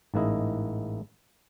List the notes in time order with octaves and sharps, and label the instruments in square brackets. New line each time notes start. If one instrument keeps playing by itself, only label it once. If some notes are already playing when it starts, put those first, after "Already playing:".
[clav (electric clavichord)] A1 G#2 A#3 E4 D#5